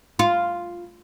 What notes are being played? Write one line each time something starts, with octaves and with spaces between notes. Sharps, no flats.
F4